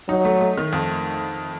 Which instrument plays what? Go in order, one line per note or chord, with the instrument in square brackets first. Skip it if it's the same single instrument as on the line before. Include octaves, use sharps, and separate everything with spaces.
[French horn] F#3 [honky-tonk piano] D#4
[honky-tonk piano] A3
A3
D#3
F2